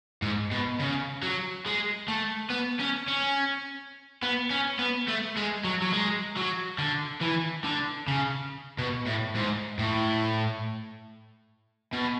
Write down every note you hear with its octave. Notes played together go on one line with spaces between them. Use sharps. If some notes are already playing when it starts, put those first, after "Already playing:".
G#2
B2
C#3
F#3
G#3
A3
B3
C#4
C#4
B3
C#4
B3
A3
G#3
F#3
F#3
G#3
F#3
D3
E3
D3
C#3
B2
A2
G#2
A2
B2